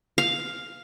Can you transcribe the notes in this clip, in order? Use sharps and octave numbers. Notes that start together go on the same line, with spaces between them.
F5